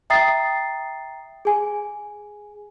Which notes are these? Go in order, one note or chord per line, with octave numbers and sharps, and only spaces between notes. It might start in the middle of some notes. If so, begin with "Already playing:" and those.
E5 G5 A#5 D#6 A6 C7
G#4 G#5